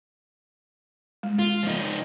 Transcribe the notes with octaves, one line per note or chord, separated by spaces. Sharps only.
G#3
F4
F3 D#4